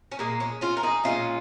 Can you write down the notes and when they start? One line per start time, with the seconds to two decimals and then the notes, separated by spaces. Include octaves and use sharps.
0.11 C#4
0.19 A#2 G#3 A#3
0.40 C#4
0.61 C#4 F4
0.77 A#4
0.83 D#4 G#4
1.04 A#2 F3 G#3 C#4 F4